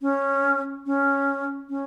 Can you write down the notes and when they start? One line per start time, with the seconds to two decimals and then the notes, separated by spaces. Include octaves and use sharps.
0.02 C#4
0.86 C#4
1.69 C#4